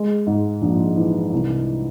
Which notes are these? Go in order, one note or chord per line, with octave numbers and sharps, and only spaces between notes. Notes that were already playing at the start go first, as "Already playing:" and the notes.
Already playing: G#3
G#2
A#1
E3
C2